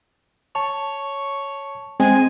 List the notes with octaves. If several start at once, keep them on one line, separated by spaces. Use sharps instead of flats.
C#5 A5
G#3 C4 G#5